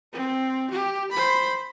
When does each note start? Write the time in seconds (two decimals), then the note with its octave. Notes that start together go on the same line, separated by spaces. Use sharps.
0.13 C4
0.70 G4
1.12 C5 B5